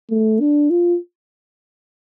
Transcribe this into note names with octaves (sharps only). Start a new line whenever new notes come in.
A3
D4
F4